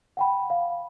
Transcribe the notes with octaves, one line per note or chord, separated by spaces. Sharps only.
F#5 G5 B5
F5